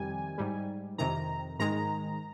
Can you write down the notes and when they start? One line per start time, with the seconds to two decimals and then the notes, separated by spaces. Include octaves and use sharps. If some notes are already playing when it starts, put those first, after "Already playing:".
Already playing: F2 C3 D#3 G3 G#5
0.38 G#2 G3
0.98 F2 C3 D#3 A#5
1.59 G#2 D#3 G#3 A#5